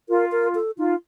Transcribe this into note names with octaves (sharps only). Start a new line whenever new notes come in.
F4 A#4
A#4
A4
D#4 F4